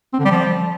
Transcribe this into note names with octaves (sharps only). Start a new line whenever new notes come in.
C4
D3
G3
F3